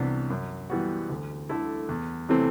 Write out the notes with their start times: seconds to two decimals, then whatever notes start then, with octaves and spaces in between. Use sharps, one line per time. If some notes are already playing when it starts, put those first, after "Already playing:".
Already playing: C2 C3 E3 B3 D4
0.30 F#2
0.70 E3 G3 B3 F#4
1.09 D2
1.49 D3 A3 E4
1.89 E2
2.29 C3 E3 A3 C4